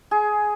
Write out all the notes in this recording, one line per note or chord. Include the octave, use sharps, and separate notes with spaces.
G#4